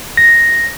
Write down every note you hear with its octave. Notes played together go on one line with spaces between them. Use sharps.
A#6